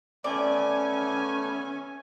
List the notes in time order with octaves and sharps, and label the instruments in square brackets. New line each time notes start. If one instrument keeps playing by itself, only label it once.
[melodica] A3 B3 [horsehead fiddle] C#4 G#5 [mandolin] D5